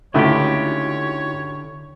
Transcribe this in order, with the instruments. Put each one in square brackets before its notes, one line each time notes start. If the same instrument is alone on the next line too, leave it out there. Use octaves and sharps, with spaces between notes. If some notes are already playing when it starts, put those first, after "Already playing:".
[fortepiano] C#2 A3 [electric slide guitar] D3 G4 [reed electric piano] D#4 E4 F#4 [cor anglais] C#5